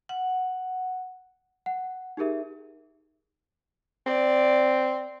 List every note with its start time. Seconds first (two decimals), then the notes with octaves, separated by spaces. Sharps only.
0.09 F#5
1.66 F#5
2.17 D#4 G4 G#4 A#4 E5
4.06 C4 D5